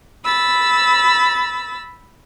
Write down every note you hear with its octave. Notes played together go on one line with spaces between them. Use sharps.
B5 E6 A6